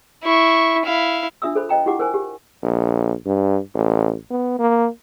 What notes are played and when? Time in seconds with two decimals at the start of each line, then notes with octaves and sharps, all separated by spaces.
0.23 E4 C#6
0.85 E4 F5
1.42 D4 F4 E5 D#6 E6
1.55 A4 C5 B5
1.69 C5 D#5 G5 A#5
1.86 E4 F4 G4 F#5 D6
2.00 A#4 C5 G#5
2.14 G4
2.63 A#1
3.27 G2
3.75 A1
4.31 B3
4.59 A#3